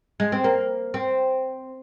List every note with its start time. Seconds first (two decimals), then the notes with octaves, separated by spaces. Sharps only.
0.20 G#3
0.32 C4
0.44 A#3
0.94 C4